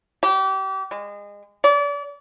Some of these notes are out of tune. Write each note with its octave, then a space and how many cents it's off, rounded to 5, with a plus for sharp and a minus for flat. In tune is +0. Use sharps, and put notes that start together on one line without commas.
G4 -30
G#3 -30
D5 -35